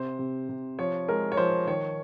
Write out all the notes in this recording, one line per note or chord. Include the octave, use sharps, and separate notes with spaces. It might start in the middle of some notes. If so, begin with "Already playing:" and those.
Already playing: C3 C5
C3
C3
F3 C#5
G#3 A#4
C#5
F3 C5
D#3 C#5